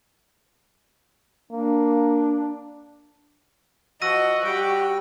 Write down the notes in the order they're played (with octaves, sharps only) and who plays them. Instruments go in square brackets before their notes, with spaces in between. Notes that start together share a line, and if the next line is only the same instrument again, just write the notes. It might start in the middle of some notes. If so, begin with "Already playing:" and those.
[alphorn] A#3 [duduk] D4
[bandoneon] F3 [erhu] F#4 [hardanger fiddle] D#5 [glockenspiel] E6 A#6 D#7
[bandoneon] G3 G5 [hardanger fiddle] G4